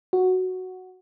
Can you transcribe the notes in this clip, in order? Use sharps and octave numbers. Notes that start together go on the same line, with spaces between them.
F#4